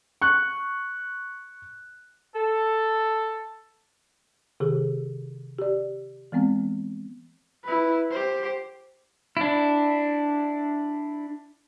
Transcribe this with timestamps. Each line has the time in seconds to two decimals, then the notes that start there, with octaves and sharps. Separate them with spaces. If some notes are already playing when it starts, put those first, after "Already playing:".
0.22 C#6 F#6
2.36 A4
4.60 C3 D#3 G4 G#4
5.59 G4 D5
6.32 E3 G#3 B3 C4
7.64 E4 B4
8.11 G4 C5
9.37 D4 E4